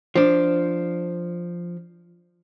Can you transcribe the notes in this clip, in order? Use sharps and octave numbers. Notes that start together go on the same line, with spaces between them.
F3 D4